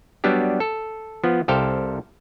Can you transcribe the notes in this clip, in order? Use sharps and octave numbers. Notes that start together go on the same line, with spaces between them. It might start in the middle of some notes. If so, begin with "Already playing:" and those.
F#3 G3 B3 D4 G4
A4
F3 B3
C2 G4 A4 C5 F5 G5